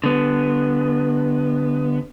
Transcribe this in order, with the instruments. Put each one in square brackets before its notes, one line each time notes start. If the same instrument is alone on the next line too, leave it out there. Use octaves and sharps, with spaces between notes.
[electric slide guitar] D3 B3